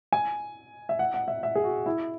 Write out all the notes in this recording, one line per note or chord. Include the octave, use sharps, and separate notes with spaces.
G#5
E5
F#5
F#5
E5
E5
G#4
F#4
E4